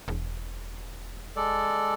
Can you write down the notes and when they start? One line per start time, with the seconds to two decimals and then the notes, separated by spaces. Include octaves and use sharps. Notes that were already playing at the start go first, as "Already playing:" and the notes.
0.08 E1
1.36 G#3 A4 D5